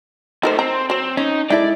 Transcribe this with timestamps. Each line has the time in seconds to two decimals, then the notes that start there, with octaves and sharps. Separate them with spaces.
0.43 F3 A3 D#4 A#4 C5
0.59 C4 A#5
0.90 F#3 C4 C5
1.17 C#4 D#4
1.50 G#3 D#4 E4 A4 D5